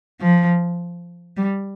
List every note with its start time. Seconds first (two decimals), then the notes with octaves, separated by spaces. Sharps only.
0.21 F3
1.37 G3